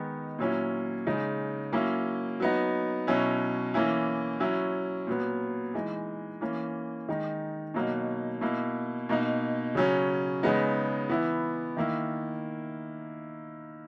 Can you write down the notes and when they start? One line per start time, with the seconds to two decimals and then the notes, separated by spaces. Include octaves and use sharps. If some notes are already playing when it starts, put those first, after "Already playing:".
Already playing: D#3 G#3 B3 D#4
0.39 A#2 F#3 C#4 E4
1.07 C#3 G#3 D#4
1.72 F#3 A#3 C#4 E4
2.40 F#3 B3 D#4
3.07 B2 F#3 C#4 E4
3.74 E3 A#3 C#4 E4
4.40 F#3 C#4 E4
5.07 A#2 F#3 B3
5.74 E3 G#3 D#4
6.41 E3 A#3 C#4
7.09 D#3 G#3 D#4
7.74 B2 F#3 A#3 D#4
8.41 B2 A#3 E4
9.09 B2 A#3 D#4
9.75 C#3 F#3 C#4
10.43 C#3 G#3 B3 D#4
11.09 E3 B3 E4
11.77 D#3 A#3 E4